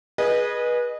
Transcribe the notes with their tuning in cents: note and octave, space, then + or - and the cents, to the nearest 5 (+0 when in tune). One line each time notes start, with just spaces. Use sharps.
G#4 +0 B4 -25 D#5 -25